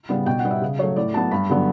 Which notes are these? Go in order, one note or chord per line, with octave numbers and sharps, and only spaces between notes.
C#3 G3 B3
B2 G5
F#5
G3 B3
E5
C#3
F#3 A3 C#5
A2 D5
F#3 B3 A5
G2 B5
D3 F#3 B3